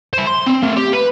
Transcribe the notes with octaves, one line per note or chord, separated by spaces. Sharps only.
E4 C5
C6
C4
A3 A#4
G4
B4